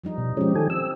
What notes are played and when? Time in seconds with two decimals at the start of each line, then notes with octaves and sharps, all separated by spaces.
0.04 F3 G3 D#4
0.18 B2
0.37 F3 G#3 C4 C#4 G4
0.56 D#3 A4 G#5
0.70 C4 E6